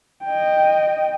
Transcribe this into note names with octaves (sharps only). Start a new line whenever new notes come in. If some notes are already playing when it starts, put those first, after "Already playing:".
D#5 G5